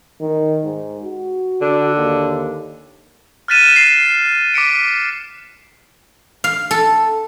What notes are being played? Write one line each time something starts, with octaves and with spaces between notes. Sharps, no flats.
D#3
G#2
F#4
D3
D#2
F6 F#6 A6 B6 D#7 E7
A6 C7
D6 B6 C#7 D7
F5
A4